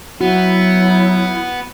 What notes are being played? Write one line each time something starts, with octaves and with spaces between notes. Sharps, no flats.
F#3 B3 E4 F#4